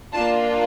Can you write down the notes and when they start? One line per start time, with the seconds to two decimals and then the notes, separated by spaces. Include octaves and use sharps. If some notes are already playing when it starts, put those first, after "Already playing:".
0.12 A#3 D4 F4 A5